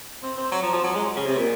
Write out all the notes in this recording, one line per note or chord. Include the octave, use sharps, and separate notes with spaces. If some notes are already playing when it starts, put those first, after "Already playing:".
C4
C4
F#3
F3
F3
F#3
G#3
C#3
C3
A#2